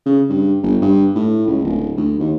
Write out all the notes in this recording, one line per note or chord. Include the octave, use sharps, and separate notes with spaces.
C#3
G2
G1
G2
A2
C#2
D1
D2
D#2